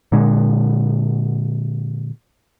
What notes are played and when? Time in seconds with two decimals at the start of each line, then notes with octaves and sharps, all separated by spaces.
0.12 A#2 D3 G#3